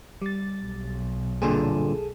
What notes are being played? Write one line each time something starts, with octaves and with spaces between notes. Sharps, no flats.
G3 A6
B1
G2 A#2 D3 G#4 A4